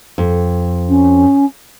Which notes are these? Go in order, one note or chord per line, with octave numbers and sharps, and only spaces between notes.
F2
C#4